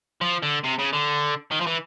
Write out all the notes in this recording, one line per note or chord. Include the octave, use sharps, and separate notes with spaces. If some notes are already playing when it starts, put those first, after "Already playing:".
F3
D3
C3
C#3
D3
D#3
F3
E3